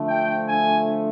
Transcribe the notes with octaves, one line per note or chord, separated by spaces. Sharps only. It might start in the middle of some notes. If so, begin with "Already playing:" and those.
Already playing: D3 F3 A3
G5
G#5